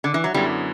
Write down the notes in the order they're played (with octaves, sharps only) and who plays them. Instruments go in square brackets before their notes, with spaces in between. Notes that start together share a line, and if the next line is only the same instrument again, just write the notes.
[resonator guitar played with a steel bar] D3
E3
F#3
[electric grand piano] F#2 D3 F#3 B3 E4 [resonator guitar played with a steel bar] G3